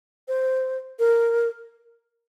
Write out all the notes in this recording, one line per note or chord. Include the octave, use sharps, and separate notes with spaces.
C5
A#4